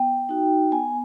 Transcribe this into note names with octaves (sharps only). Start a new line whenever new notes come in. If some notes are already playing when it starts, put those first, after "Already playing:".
Already playing: B3 G5
D#4 F#4
B3 G#5